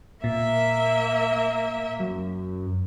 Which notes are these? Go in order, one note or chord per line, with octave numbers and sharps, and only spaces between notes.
A#2 A#3 E5
F#2